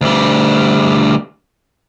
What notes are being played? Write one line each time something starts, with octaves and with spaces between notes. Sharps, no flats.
D2 G3